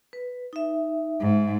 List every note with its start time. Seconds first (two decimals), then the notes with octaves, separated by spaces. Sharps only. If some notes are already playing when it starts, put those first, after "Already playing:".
0.13 B4
0.53 D#4 E5
1.20 G#2